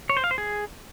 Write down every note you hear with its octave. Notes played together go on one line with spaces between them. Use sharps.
C#5
C5
F5
C5
G#4